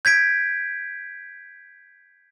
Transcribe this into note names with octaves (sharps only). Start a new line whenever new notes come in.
G6 G#6 B6 D7